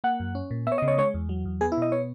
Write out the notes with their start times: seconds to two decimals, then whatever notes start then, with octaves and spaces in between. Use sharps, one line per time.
0.04 A#3 F#5
0.20 F#2
0.35 C#4
0.51 A#2
0.67 B3 C#5 E5
0.78 D#5
0.82 C#3
0.88 C#5
0.98 G#3 C#5
1.14 E2
1.29 F#3
1.45 E2
1.61 B3 G#4
1.72 E4
1.77 B2 D#5
1.92 B3 C#5